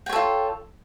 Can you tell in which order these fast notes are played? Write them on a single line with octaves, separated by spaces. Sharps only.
G5 C#5 A4 F4